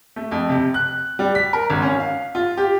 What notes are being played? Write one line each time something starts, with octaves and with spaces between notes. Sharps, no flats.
A3
F2
C3
F#6
G3
B6
A#4
G#1
C#4
F5
F4
G4